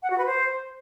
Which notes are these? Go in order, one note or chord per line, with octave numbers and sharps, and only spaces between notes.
F#5
F#4
B4
C5